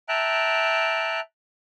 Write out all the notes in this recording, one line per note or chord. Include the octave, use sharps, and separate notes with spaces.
E5 G5 A5 A#5 F#6